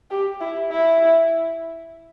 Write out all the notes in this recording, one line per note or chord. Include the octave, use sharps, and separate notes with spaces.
G4
E4
E4